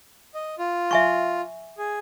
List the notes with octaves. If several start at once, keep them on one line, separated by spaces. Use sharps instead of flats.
D#5
F4
E5 G#5 C#6
G#4